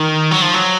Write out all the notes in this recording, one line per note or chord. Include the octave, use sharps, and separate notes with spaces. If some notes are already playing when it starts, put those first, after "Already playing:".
Already playing: D#3
F#3
F3
F#3